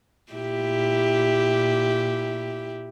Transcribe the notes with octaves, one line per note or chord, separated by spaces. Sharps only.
A#2 E4 G4